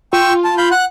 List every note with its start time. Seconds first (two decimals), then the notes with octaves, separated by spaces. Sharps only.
0.13 F4 G5 C#6 E6
0.44 A5
0.58 F5 B5 G6
0.71 F#5 F#6